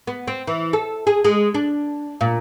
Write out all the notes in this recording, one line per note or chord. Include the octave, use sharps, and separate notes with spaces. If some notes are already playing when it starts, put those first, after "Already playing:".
B3
C4
E3
A4
G#4
G#3
D4
A#2